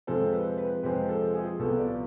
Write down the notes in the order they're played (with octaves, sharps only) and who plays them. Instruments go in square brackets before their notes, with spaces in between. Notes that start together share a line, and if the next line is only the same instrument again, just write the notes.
[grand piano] F2 C3 F3 G#3 C4 A4
B4
B4
F2 C3 F3 G#3 C4 B4
A4
G#4
C2 C3 F3 B3 A4
D5